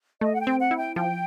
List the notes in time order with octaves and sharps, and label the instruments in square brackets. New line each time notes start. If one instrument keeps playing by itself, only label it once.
[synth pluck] A3 [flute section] D#5
[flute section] F#5
G5
[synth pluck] C4
[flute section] F#5
[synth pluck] E4
[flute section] G5
[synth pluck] F3 [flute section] G5